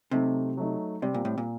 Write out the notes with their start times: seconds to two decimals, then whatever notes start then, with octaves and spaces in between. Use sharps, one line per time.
0.11 C3 F#3 A3 D#4
0.57 F#3 A3 D#4
1.02 C3 G3 C4 G4 D5
1.14 A#2
1.25 A2
1.38 A#2